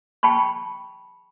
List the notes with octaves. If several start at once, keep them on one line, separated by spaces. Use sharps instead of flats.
G5 A5 B5 C#6